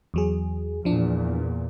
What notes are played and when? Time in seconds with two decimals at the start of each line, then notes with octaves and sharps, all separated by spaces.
0.14 E2 F#3 G#4
0.85 E2 A#2 F3 D4